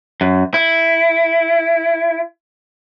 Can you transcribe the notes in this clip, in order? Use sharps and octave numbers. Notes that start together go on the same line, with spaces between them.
F#2
E4